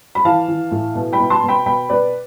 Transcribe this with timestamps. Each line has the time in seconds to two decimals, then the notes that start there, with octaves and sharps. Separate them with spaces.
0.15 B5
0.25 E3 F5 A5
0.48 E3
0.71 A2
0.95 B2
1.13 G5 B5
1.20 B2
1.30 A5 C6
1.43 B2
1.48 G5 B5
1.66 B2 G5 B5
1.89 B2 B4 D5